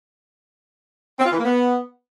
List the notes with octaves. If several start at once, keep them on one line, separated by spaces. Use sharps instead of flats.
C4
F4
E3
A#3
B3